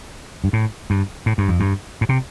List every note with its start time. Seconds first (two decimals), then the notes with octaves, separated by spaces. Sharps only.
0.44 G2
0.53 A2
0.90 G2
1.26 A2
1.38 G2
1.49 F2
1.60 G2
2.01 A2
2.09 C3